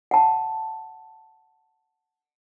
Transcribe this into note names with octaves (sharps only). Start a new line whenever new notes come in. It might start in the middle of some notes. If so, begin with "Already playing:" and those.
F#5 A5